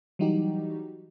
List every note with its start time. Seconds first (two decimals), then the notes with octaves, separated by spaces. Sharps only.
0.19 E3 F#3 G3 D#4 F#4 G4